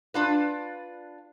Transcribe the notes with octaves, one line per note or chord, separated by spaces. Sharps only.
D4 F4 B4